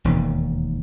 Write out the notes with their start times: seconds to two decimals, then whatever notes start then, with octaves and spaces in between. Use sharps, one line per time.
0.04 E1 D#2 D#3